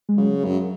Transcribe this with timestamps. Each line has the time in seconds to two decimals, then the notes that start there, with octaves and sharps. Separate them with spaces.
0.09 G#3
0.17 C#3 F#3
0.44 F#2